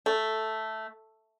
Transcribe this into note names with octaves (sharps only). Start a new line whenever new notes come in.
A3